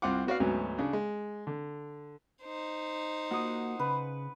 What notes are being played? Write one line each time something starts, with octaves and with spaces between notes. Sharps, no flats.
C2 C4 F4 F#5 D6
B3 F#4 D5 F5
D2 G#2 F#3 B3 C#4
C#3 D4
G#3
D3
D#4 C5
A#3 F4 F#4 F#5 D#6
C#3 B4